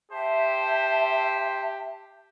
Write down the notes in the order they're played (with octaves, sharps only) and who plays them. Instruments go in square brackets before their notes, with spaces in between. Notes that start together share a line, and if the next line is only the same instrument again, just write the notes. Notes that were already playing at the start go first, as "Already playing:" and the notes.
[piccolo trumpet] G4 [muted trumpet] C5 [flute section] E5 A5